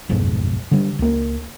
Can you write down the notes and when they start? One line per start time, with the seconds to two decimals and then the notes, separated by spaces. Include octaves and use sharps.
0.09 F#1 B1 F2 G#2
0.71 D3 G3
0.99 C#2 A#3